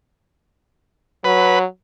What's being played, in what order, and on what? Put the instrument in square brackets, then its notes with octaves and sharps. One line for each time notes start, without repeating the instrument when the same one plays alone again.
[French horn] F#3 [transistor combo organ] B4